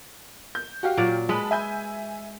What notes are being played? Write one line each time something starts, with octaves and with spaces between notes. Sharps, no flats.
G6
F#4 G4 F5
A#2 F#3 D5
G#3 B4 A5 B5
E5 G#5 G6